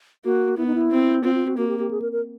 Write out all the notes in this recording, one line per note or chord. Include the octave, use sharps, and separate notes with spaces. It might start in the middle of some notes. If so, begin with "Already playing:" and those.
A#3 F#4
B3 E4
D#4
E4
C4
C4 F4
F4
F#4
A#3 F#4
G4
G4
G#4
A#4
A#4